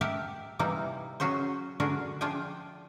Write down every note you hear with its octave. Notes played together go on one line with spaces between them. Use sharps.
G4 A#4 D#5 E5 F#5 A5
C3 E3 G3 A#3 D#4 E4
F#3 C#4 F#4 G#4 C5
D3 D4 F#4 G#4 A#4
F3 D4 F4 G#4 G5 G#5